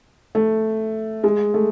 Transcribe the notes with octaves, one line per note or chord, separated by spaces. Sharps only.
A3
G#3
A3